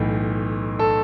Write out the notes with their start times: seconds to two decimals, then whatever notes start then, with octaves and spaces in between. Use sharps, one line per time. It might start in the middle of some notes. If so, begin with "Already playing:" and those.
Already playing: B1 A2 E3
0.79 A4